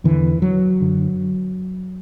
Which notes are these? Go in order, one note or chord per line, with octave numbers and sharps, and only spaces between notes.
E2 D3 E3
F#3
F#2 D3